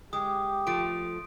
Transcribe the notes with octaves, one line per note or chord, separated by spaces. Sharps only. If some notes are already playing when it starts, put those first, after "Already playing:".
G#3 G4 D#6
F3 A3 D7